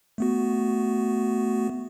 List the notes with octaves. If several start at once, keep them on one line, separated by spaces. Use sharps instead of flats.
A3 B3 F#4